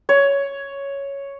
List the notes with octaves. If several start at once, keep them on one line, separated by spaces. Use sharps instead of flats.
C#5